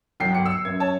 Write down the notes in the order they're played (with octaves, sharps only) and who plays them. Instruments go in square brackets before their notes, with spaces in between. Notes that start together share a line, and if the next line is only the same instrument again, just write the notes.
[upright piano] C2 G5 C7 [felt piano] F#3
[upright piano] G1 C#7
[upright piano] E6 [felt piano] C#7
[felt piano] F#2 [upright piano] G#6
[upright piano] C#5 A5